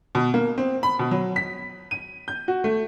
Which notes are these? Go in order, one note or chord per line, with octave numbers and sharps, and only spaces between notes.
B2
A#3
C4
B5
B2
F#3
B6
D#7
G6
F#4
A3